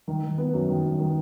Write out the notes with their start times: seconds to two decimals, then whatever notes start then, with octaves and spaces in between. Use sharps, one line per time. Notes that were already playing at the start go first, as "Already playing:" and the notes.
0.08 D#3
0.23 D#3
0.38 B3
0.53 F#2
0.68 D#3
0.84 F#2
0.99 D#3